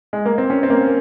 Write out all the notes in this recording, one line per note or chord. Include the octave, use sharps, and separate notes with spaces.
G#3
A#3
C4
C#4
C4
A#3